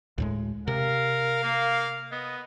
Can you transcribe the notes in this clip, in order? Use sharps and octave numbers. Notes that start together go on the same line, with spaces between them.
D2 A2 G#3
C3 A#4 F5
A#3
B3 D#5